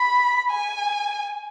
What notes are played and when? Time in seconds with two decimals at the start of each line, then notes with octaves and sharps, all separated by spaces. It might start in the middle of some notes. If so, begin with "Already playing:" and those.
Already playing: B5
0.50 G#5